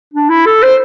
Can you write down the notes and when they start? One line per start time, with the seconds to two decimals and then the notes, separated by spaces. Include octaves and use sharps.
0.14 D4
0.29 E4
0.45 A4
0.62 C5